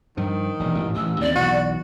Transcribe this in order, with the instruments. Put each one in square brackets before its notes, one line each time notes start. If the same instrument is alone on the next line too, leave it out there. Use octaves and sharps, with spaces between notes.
[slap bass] G2 F3 [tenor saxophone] D#3
[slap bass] E1 A#1
A1 G#2
[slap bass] A1 [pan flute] E6
[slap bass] D#2 C3 C4 [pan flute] D5
[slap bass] B1 E2 [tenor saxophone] F#4